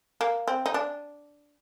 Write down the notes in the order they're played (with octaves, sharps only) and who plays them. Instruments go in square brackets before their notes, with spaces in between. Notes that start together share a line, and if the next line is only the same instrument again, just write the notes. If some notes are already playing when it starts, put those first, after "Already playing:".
[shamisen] A#3
C4
D#4
D4